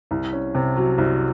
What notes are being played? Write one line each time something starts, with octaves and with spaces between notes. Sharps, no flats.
C2
C#4
C3
F#3
C2